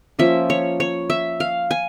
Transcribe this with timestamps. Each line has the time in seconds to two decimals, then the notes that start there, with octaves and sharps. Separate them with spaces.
0.19 F3 A#3 C#4 E5
0.50 C#5
0.80 C#5
1.10 E5
1.40 F5
1.71 G#5